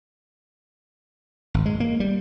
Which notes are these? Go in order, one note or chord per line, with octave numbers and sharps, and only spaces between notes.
G#1
G#3
A#3
G3